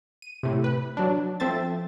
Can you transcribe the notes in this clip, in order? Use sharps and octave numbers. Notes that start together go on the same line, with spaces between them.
D#7
A2 C3
B4
F#3 D4
F3 C4 A4 C5 E5 A6